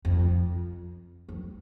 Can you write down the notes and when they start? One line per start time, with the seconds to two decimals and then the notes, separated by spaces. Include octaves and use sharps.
0.05 F2
1.29 F2